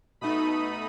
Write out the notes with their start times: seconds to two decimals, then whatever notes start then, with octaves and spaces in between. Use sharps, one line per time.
0.21 B2 A3 D#4 B5 D#6